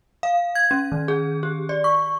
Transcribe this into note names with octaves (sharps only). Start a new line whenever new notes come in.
F5
G#6
C#4
D#3
G#4
G4
D5
C#6